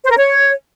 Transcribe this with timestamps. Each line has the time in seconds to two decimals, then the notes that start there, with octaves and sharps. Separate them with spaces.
0.04 C5
0.10 A#4
0.17 C#5